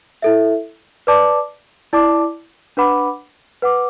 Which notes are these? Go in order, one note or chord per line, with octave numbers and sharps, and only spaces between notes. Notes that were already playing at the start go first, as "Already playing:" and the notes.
E4 A4 E5
B4 D5 A5 D6
E4 D5 A5 D6
D4 B4 F#5 B5 D6
B4 F#5 D6